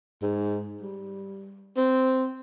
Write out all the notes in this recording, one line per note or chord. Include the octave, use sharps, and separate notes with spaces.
G#2
G3
C4